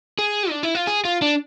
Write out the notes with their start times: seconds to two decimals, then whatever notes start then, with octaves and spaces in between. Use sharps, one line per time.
0.19 G#4
0.50 D4
0.63 E4
0.75 F4
0.87 G#4
1.05 F4
1.22 D4